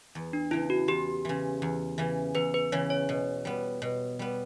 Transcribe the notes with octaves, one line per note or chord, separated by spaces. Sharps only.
E2
D4
C#3 E3 E4
F#4
E2 G4
C#3 E3
E2
C#3 E3
E2 B4
B4
C#3 E3 C#5
C#5
B2
G3 B3
B2
G3 B3